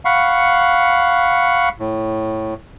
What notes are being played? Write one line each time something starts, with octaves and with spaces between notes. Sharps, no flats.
F5 F#5 B5 C#6
A2